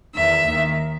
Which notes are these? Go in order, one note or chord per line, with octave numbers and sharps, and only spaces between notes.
E2 D#3 E5
D#2 D#3